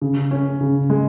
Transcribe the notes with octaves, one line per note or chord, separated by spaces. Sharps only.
C#3
C#4
C#3
G#3